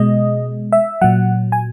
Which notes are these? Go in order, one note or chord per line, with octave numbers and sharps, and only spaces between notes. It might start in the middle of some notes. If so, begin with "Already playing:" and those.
Already playing: B2 G#3 D#5
E5
A#2 F#3 F#5
G#5